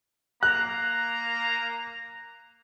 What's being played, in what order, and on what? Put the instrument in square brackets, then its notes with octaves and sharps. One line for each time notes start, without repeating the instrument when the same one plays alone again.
[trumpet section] A#3 A#5 [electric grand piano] F#6